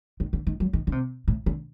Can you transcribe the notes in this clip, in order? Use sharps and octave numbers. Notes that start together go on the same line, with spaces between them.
D#3
D3
D#3
F#3
D#3
D3
C3
A2
D3